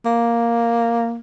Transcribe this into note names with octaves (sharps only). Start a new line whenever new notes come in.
A#3